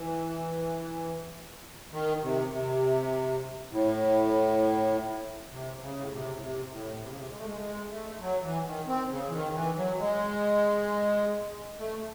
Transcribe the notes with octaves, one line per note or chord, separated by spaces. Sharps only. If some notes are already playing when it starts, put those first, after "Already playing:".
Already playing: E3
D#3
C3
C3
A2
C3
C#3
A2
C3
A2
C3
A2
C3
C#3
C3
G#3
A3
G#3
G#3
A3
F#3
E3
D#3
C4
C#3
E3
D#3
E3
F#3
G#3
A3